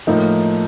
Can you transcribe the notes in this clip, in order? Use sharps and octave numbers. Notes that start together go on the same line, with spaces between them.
A2 F3 A#3 D#4